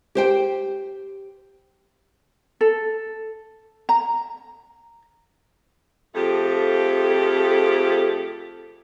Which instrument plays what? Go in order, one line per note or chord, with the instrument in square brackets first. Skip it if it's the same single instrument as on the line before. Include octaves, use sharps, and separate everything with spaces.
[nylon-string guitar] G4 C5 G5
[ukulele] A4
A#5
[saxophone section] F2 F3 A3 G4 G#4